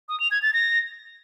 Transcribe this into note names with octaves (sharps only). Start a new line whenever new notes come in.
D#6
F7
G#6
A6
A#6